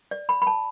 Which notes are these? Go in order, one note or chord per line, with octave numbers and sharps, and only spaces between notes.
D5
B5
B5
A5